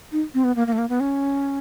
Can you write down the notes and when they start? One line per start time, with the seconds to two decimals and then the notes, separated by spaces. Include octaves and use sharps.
0.12 D#4
0.34 C4
0.44 B3
0.56 A#3
0.67 A#3
0.73 A3
0.78 A#3
0.89 B3
1.00 C#4